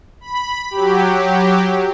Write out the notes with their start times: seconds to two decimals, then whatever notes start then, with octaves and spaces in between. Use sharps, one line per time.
0.21 B5
0.71 F#3 G4